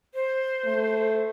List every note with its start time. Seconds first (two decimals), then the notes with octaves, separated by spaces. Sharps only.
0.14 C5
0.64 A3